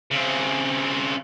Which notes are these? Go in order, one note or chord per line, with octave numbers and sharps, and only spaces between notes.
C#3 C4